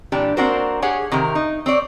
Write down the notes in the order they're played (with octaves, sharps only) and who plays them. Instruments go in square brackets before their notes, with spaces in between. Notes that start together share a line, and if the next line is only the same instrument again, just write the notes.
[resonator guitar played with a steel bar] A#2 E3 D4 G4
A#3 C4 D4 F#4 A#4 C5
G4 G#4 C#5 F#5
C3 D#3 G4 A#4
D#4
C4 C#5 D5